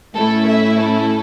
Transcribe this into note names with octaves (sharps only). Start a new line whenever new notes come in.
A2 A3 C#4 E4 A4
E5
A4